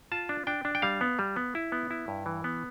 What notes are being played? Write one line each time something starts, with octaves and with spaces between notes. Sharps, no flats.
F4 A5
D4
D4 G5
D4
G5
G3 F5
B3
G3
B3
E4
B3
E4
G2
E3
B3